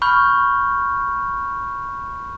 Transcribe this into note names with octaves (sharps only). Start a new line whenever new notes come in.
B5 C#6 F6 G6